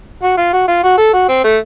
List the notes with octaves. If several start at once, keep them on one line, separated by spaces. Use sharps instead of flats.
F#4
F4
F#4
F4
F#4
A4
F#4
C4
A3